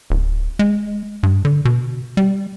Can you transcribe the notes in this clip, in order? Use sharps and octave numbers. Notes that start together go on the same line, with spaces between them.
D1
G#3
G2
D3
B2
G3